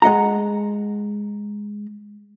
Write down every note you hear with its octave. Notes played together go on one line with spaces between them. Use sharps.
G#3 D#5 F#5 A#5